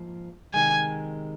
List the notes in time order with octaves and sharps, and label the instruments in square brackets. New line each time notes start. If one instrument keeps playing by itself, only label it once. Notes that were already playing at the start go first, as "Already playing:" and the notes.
Already playing: [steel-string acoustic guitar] G#2 F3 A#3
[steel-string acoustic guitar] C3 D#3 G#3 [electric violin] G#5